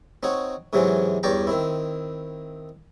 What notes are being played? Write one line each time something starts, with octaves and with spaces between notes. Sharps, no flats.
C4 D#4 F#4 C#5
G#2 C3 E3 F#3 G#3 C4
E2 G2 C#5 D5 G5 A#5
D#3 C4 E4